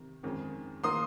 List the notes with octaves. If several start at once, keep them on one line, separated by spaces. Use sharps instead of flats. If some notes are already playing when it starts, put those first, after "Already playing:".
Already playing: C3 D#3
F2 D#3 G#3 C#4
D#3 A#3 C6 D#6